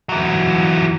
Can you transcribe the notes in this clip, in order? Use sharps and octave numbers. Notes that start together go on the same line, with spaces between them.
E3 F#3